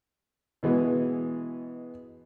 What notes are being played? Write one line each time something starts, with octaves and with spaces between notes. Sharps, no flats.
B2 E3 G#3 B3